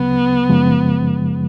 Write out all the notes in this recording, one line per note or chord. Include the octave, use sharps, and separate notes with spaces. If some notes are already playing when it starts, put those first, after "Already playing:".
Already playing: D2 C#3 F#3 B3
F#2 C#3 F3 G#3